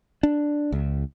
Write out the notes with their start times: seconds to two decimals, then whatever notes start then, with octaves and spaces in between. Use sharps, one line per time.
0.23 D4
0.72 C#2